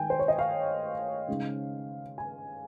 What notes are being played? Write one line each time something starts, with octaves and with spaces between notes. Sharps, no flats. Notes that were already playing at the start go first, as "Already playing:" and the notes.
Already playing: D#3 G#3 D#4 G5 G#5
C5
C#5
D#5
F5
C#3 G#3 D#4
G#5